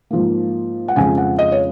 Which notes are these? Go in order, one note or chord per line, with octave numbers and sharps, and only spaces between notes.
G#2 F3 A#3
F#5
F2 C#3 G#3 G#5
F#5
D#5
C#5